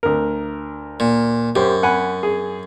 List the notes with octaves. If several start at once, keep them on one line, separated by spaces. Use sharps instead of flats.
D2 A#4
A#2
F#2 G4 C5
F#5 G#5 B5
G#4